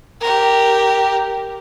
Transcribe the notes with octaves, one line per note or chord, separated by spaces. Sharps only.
G4 A#4